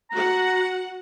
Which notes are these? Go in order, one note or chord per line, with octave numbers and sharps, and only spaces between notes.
F#4 F#5 A#5